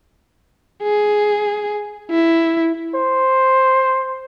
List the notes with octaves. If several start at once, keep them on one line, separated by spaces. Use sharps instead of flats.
G#4
E4
C5